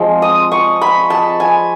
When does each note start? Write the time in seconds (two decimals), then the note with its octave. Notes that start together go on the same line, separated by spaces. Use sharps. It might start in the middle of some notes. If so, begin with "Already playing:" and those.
Already playing: F3 G#3 C4
0.22 D#6
0.52 C#6
0.81 B5
1.10 A5
1.40 G#5